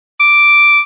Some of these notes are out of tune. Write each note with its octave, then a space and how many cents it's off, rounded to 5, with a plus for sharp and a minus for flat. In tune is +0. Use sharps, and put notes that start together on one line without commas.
D6 +0